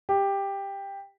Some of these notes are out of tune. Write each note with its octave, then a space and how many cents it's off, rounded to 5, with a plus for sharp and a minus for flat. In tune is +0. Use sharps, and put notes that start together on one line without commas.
G4 +10